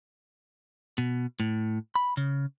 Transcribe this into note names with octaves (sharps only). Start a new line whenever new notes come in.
B2
A2
B5
C#3